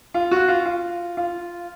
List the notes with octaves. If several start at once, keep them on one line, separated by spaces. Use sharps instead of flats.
F4
F#4
F4
F4
F4